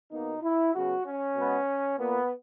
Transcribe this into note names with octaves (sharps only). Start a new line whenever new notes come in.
B2 A#3 D#4
E4
C#3 F#3 B3 F#4
C#4
B2 G#3 B3
A#2 A#3 B3